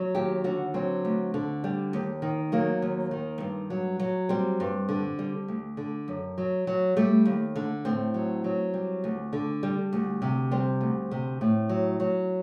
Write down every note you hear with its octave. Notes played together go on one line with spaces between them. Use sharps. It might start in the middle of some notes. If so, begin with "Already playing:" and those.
Already playing: F#3
D#2 G4
D3 F#4
F#3 C4
D2
D3
G3
D#2
D#3
F#3 A#3
D#2
D#3
G2
F#3
F#3
G3 C4
G2
D3
G3
D2
D3
F#2
F#3
F#3
G3 A3
D#2
D3
A2 C4
F#3
F#3
G3
D2
D3
G3
D2
C3
G3 C4
D2
C3
A2
F#3
F#3